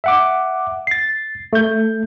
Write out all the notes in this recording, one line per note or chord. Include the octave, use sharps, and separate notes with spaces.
E5 F#5 D6
A6 C7
A3 G6